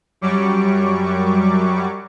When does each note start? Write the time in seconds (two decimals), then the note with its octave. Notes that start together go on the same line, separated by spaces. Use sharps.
0.21 F#2 F#3 G3 C#6 D6